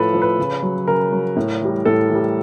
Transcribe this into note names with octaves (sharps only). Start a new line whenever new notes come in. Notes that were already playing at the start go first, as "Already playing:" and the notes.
Already playing: A2 F3 A4 B4
F3
B4
C#3
F#3
C#3 A#4
F#3
A2
E3 G3
A2 A4
E3 G3